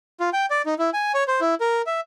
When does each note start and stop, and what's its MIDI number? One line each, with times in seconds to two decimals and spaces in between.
0.20 0.30 65
0.33 0.46 79
0.50 0.62 74
0.66 0.74 63
0.79 0.90 64
0.93 1.12 80
1.14 1.24 73
1.28 1.40 72
1.41 1.55 64
1.61 1.82 70
1.86 2.01 76